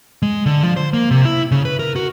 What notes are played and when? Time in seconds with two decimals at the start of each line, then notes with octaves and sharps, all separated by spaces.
0.22 G#3
0.46 D3
0.63 F3
0.77 C5
0.93 A#3
1.11 C3
1.25 E4
1.51 C#3
1.65 B4
1.79 A#4
1.96 F#4